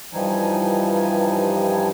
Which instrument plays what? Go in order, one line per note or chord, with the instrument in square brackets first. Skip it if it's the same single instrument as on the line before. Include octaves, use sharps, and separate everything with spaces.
[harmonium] G2 E3 F3 G3 D#4 G#5